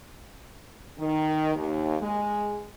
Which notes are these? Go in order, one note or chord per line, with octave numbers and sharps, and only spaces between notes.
D#3
D#2
G#3